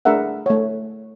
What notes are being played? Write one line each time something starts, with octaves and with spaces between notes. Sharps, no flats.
A3 D4 G#4 A#4 E5 F#5
A3 C#5